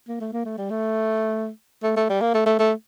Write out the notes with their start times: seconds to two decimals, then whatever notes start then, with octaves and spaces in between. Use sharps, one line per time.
0.08 A#3
0.21 A3
0.33 A#3
0.45 A3
0.58 G3
0.70 A3
1.83 A3
1.96 A3
2.09 G3
2.21 A#3
2.34 A3
2.46 A3
2.59 A3